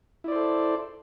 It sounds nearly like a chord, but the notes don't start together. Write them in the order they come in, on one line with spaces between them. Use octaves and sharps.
E4 D5 C5 A4